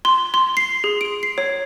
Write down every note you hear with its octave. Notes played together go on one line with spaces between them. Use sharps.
C6
C6
C7
G#4
D7
C7
C#5